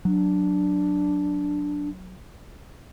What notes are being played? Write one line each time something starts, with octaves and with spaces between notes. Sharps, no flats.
F#3 D4